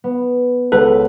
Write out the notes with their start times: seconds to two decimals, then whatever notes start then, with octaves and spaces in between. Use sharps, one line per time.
0.04 B3
0.72 C#2 A4 B4 F#5 F#6